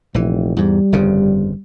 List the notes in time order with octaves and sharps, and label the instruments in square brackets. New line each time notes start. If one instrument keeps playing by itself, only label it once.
[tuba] F1 [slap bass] A#1 E3
[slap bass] E2 G#2 [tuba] G3
[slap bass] G1 F2 C#3